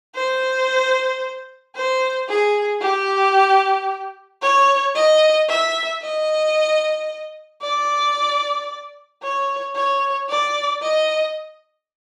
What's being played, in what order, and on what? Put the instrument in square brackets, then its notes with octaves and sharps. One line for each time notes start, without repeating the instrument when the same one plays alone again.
[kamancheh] C5
C5
G#4
G4
C#5
D#5
E5
D#5
D5
C#5
C#5
D5
D#5